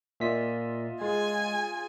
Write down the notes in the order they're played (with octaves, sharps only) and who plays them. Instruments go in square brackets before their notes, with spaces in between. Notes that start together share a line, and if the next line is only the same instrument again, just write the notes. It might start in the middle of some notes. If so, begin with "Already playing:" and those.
[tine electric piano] A#2 B6 [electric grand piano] F4 D#5 E5
[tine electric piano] G#3 [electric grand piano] F4 G#4 [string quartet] G#5